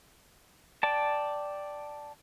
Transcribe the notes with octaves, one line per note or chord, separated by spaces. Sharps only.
D5 G5 A5